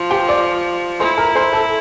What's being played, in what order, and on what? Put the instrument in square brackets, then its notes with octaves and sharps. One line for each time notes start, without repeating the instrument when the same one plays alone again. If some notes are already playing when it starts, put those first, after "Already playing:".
Already playing: [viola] F3
[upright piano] G4 G5
D5 D6
[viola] E4 [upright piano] C5 C6
[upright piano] A#4 A#5
C5 C6
A4 A5